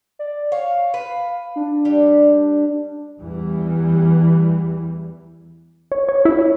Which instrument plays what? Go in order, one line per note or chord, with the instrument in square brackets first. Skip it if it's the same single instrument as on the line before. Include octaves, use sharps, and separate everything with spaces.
[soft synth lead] D5
[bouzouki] C#5 [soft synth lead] F5
[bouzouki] B4
[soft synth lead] D4
[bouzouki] G3
[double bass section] E2 E3 G3
[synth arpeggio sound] C#5
C#5
E4
C#5